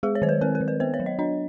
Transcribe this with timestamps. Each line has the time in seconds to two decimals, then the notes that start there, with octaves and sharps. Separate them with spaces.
0.03 G#3 G#4
0.15 C#5
0.22 D#3 C5
0.29 B4
0.41 C4 A#4
0.55 A#4
0.61 D#3
0.68 B4
0.80 B3 C5
0.94 C#5
1.00 F#3
1.06 D#5
1.19 D4 D#5